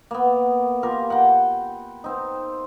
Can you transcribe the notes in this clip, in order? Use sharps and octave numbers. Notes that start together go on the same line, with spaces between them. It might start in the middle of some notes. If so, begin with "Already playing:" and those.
A#3 B3
F4 G4 A#4
F#5 G5 B5
C4 D#4